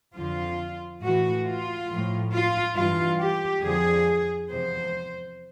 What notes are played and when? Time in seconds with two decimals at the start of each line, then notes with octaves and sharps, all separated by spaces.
0.15 F2 D3 F3 F4
1.03 A2 E3 F#4
1.47 F4
1.90 A2 F3
2.33 F4
2.76 G2 E3 F4
3.21 G4
3.63 F2 D3 F3 G#4
4.50 E2 C3 F3 C5